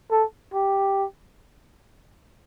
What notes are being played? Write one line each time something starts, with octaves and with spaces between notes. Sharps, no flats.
A4
G4